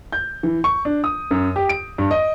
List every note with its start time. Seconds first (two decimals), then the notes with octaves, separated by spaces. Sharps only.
0.13 G6
0.43 E3
0.64 C#6
0.85 D4
1.04 D#6
1.31 F#2
1.56 G4
1.69 D7
1.98 G2
2.11 D#5